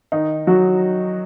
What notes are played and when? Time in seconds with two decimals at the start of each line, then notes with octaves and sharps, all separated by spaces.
0.12 D#3 D#4
0.47 F#3 F#4